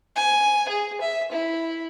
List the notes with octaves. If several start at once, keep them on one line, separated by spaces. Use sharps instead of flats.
G#5
G#4
E5
E4